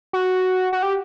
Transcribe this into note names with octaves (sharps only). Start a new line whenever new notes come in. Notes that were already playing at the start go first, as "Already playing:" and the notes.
F#4
F#4
G4